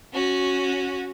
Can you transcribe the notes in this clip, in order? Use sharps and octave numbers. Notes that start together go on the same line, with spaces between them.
C#4 F#4